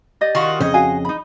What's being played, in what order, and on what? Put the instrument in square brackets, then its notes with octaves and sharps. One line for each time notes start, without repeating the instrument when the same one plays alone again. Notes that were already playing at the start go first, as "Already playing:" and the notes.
[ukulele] G4 D5 D#5
[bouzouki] D#3 F4 F#4
[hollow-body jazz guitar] F2 C#3 [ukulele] C5 C#5 [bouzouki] D#5
[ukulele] F#4 F5 G#5
D#4 B5